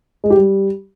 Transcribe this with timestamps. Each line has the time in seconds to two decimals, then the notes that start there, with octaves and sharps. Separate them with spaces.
0.24 G#3
0.30 G4
0.37 G3